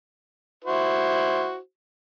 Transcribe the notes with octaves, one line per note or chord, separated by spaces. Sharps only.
E4 F#4 C5